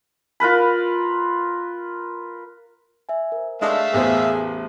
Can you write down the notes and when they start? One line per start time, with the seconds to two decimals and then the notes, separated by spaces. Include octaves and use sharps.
0.40 F4 A#4 B4 B5
3.09 E5 G#5
3.32 A#4 C5
3.62 G#3 A3 D4 E5 F5
3.94 A1 E2 G#4 A#4 C5